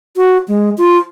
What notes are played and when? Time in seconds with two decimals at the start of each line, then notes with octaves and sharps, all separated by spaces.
0.16 F#4
0.48 G#3
0.78 F4